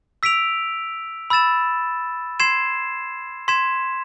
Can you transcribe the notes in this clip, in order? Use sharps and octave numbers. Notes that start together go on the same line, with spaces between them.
E6 B6 D7 F7
B5 E6 A6 E7
C6 G#6 C7 E7
C6 G#6 B6 E7